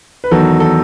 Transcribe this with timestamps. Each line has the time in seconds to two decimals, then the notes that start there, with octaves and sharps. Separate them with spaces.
0.24 B4
0.31 E2 D#3 F#3 A4
0.60 A4